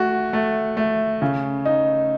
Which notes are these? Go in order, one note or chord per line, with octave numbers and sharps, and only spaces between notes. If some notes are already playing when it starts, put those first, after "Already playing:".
Already playing: A3 F#4
A3
A3
C#3
D#4